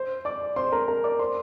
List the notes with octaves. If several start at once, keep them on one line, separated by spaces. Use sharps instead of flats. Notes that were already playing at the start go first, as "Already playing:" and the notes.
Already playing: C5 C6
D5 D6
C5 C6
A#4 A#5
A#4 A#5
D5 D6
C5 C6